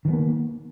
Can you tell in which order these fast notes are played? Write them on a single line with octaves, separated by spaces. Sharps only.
D#3 F3 B3 A#3